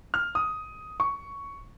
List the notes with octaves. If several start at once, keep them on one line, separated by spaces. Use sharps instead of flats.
F6
D#6
C#6